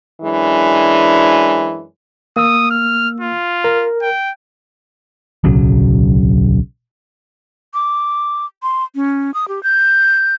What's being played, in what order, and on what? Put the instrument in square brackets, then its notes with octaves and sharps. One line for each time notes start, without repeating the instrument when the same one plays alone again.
[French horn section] F#2 E3 G#3 D4
[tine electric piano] A#3 E6 [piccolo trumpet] D#6
[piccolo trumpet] F6
F4
[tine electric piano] A#4
[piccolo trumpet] G5
[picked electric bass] D1 B1 C#3 F#3
[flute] D6
C6
C#4
D#6
G4
G6